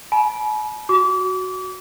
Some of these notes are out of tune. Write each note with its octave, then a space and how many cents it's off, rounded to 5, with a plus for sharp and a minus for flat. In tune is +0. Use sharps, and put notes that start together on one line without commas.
G#5 +45 B5 -35
F#4 +0 D6 -35